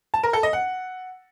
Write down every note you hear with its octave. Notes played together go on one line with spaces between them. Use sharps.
A5
A#4
A4
D#5
F#5